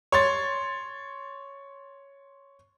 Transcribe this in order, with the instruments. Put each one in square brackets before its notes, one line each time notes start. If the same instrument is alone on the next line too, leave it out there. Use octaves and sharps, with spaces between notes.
[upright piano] C#5 C6 A6